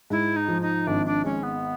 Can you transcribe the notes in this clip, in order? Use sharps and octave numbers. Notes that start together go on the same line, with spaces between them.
G#2 E4
D#4
F3
D#4
G#1 D4
D4
G#2 C#4
B3